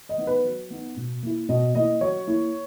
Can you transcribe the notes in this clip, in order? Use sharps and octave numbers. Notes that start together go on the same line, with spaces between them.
D#5
B3 D#4
B4
F#3
B3 D#4
B2
A#3 E4
B2 D#5
A#3 E4 D#5
F#3 C#5
A#3 E4